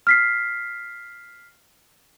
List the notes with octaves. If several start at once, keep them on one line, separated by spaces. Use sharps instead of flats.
F6 B6 C7